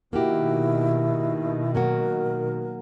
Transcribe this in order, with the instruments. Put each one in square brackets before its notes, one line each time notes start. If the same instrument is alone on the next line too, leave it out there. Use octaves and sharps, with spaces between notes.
[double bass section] B2 D#3 [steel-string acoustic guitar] A#3 F#4 G4 [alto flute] E4
[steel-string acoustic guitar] F#3 A#3 F#4 [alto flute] A#4